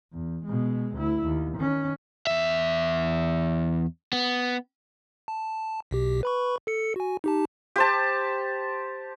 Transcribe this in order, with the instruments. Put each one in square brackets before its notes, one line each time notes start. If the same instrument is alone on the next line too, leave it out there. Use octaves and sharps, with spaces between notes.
[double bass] E2
B2 G#3
D2 E4
D#2
D#3 C#4
[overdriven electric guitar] E2 E5
B3
[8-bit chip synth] A5
B1 B2 G4
B4 B5 C#6
A4 C#7
F#4 G#5
D#4 G4 A5
[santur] G4 C5 A5